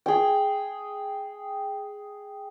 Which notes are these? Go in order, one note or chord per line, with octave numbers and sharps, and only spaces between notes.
G#4 G5